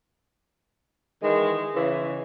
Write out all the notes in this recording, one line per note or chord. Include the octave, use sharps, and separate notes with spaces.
D#3 E3 G#3
C#3 E3